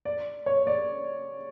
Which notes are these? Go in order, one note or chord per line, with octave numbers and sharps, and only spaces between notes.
D5
C#5
D5